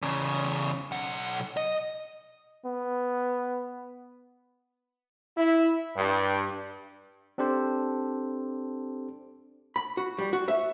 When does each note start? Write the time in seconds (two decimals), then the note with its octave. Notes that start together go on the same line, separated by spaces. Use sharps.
0.02 E2 C#3
0.92 B1 F#5
1.57 D#5
2.65 B3
5.37 E4
5.96 G2
7.38 C4 D4 G4 A4 C5
9.76 B5
9.97 F#4
10.19 G3
10.33 F#4
10.48 E5